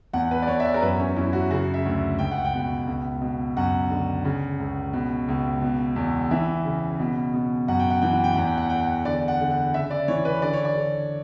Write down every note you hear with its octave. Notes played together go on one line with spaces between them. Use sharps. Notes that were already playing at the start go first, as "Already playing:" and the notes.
E2 F#5
B4
D5
E2 C#5
E5
D5
A#4
F#2 B4
C#4
F#2 E4
F#4
C#3 F#4
E5
D2
C#2 G5
F#5
G5
B2
C#2
B2
F#2 F#5
D3
C#3
C#2
B2
C#2
B2
E2
E3 E5
C#3
B2
B2
F#2 F#5
G5
F#5
E3 G5
F#5
G5
E2 F#5
G5
F#5
E2 G5
F#5
D3 D5
F#5
D3
F#5
C#3 E5
D5
E3 C#5
B4
D3 D5
C#5
D5
D3